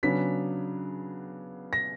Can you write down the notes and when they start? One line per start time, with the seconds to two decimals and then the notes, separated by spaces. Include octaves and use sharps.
0.03 C#3 F#3 B3 D4 B6
1.73 A#6